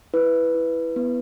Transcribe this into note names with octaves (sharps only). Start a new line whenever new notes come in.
E4 B4
E4
B3